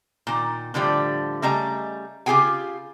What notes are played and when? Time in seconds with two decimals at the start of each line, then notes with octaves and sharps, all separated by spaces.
0.27 A#2 D#3
0.74 A2 D3 F3 G3
1.42 C#3 G3 A3 D#5 A#5
2.26 C#3 F4 G4 G#4 G5 G#5